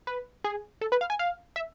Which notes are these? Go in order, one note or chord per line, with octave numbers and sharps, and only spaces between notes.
B4
G#4
A4
B4
F5
G#5
F5
E5